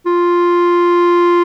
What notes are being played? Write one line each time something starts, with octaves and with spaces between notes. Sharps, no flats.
F4